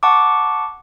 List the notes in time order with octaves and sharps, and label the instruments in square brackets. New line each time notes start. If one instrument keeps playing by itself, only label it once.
[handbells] F#5 A5 C#6 D6